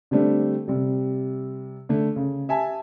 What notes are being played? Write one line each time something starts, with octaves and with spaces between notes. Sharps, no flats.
D3 G3 A3 C4 D4
C3 G3
D3 A3
C#3
G4 E5 G#5 A5